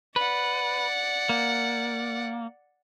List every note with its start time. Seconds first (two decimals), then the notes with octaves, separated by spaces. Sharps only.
0.16 B4 D5 F#5
1.29 A#3